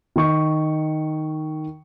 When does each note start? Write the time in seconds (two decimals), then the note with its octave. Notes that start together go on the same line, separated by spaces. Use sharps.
0.16 D#3 C#6